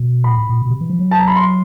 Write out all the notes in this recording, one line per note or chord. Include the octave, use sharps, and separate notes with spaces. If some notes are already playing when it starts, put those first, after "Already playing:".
Already playing: B2
A#2 B5
A2
A#2
B2
C3
E3
F3
F#3
A5
A#5
B5
C6